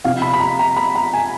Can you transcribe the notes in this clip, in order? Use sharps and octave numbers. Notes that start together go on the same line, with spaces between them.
C3 F3 F5
B5
B5
A#5
A#5
B5
A#5
G#5